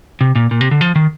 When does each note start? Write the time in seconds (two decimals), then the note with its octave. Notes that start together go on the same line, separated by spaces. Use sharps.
0.21 C3
0.35 A#2
0.51 A#2
0.61 C3
0.71 D3
0.81 F3
0.96 D#3